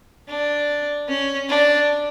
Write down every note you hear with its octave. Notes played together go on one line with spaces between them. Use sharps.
D4
C#4
D4